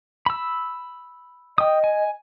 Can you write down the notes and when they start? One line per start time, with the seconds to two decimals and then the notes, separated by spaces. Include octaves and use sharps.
0.26 B5 E6
1.58 D#5 G5 D#6
1.84 G#5